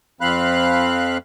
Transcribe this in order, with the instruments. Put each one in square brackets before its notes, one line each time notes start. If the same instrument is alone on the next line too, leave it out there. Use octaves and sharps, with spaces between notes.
[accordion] F2 F3 C4 F5 B5 F#6